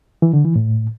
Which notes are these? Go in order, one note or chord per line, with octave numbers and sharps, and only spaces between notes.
E3
D3
E3
A2